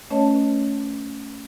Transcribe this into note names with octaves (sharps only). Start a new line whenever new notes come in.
A3 C#4 B4 C#5 D#5 A5